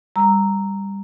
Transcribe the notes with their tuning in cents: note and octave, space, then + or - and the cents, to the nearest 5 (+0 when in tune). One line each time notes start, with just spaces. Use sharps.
G3 +15 A#5 -10 E6 +0